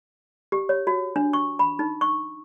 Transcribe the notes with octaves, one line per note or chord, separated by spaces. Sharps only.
G4
C#5
F#4
D4
C#6
B5
D#4
C#6